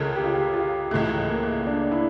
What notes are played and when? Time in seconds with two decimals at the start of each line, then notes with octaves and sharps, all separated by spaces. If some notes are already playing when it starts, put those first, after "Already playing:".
Already playing: C#2 C#3 A4 A#4
0.16 G4
0.24 F4
0.34 G4
0.53 F4
0.91 C#2 C#3 E3 A3
1.29 A#3
1.67 D4
1.92 E4